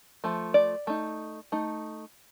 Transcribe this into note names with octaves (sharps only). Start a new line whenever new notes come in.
F3 A3
D5
A3 D#4
A3 D#4